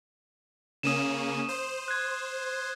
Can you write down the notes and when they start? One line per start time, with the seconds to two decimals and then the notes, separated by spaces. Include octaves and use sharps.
0.83 C#3 A#3 C#4 D#6 D#7 E7
1.49 C5
1.88 F#6 G#6